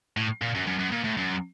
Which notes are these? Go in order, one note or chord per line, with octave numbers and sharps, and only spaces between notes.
A2
A#2
F#2
F#2
F#2
A#2
A2
F#2